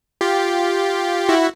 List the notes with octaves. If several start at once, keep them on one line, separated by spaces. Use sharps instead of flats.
F4 G4
E4 F#4